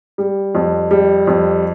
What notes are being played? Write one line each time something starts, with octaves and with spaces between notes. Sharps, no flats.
G3
F2
G3
F2